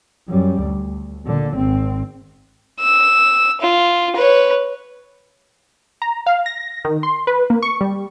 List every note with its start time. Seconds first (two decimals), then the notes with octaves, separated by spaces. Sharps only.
0.28 F#2 G3
0.61 D2
1.25 A#2 D3
1.56 G#1 C4
2.80 E6
3.61 F4
4.16 B4 C#5
6.02 A#5
6.26 F5
6.46 A#6
6.85 D#3
7.03 C6
7.27 B4
7.50 A#3
7.62 C#6
7.81 G3